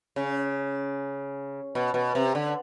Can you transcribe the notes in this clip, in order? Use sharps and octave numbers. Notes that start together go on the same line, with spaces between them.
C#3
B2
B2
C3
D3